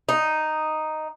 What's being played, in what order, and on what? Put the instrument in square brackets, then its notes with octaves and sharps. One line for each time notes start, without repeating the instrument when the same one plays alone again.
[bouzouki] D#4